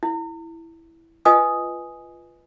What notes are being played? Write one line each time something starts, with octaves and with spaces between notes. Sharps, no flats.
E4
F4 B4 D#5 G#5 D#6